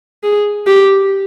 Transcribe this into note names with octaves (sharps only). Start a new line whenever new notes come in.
G#4
G4